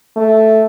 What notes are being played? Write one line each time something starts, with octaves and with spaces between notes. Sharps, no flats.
A3